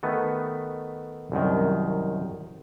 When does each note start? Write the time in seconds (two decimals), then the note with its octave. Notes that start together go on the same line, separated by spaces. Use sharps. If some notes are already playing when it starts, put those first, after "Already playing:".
0.03 D#3 A3 B3
1.32 C2 F#2 D#3